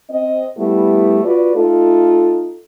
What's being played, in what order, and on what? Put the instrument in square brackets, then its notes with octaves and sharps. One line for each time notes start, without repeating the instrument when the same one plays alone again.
[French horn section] C4 D#5
G3 A3 B3 E4
F4 F#4 B4 D5
A3 D#4 F4 A4